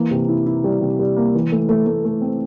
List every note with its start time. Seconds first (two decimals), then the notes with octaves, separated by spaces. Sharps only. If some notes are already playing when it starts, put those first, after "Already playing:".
Already playing: E3 A#3
0.11 C3
0.28 E4
0.46 E4
0.64 G3
0.81 C3
0.99 G3
1.16 A#3
1.34 E3
1.52 A3
1.69 A3
1.86 A3
2.05 A3
2.21 C4